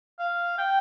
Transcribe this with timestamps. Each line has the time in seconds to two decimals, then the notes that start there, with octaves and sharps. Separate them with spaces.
0.19 F5
0.58 G5